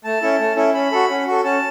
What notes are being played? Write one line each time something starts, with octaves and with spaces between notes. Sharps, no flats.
A3 A5
C#4 E4 A4
A3
C#4 E4 A4
C#4 B5
F#4 A4
C#4
F#4 A4
C#4 A5